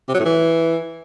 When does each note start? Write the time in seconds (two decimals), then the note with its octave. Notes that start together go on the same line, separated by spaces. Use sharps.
0.09 C3
0.14 F#3
0.20 A2
0.25 E3